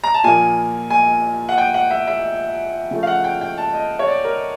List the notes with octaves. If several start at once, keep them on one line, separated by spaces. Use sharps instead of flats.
A#5
A5
A#2 F3 A#3 G#5
G#5
F#5
G5
F#5
E5
E5
C#3 F3 A3
F5
F#5
G5
G5
A5
D#5
C#5
D5
A#4